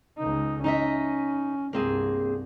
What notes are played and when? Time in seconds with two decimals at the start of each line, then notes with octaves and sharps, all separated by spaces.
0.18 C#2 D#4
0.64 C#4 D#4 D#5 E5
1.73 C2 G2 A#3 C4 G#4